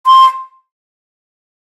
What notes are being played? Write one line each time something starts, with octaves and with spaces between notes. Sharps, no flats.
C6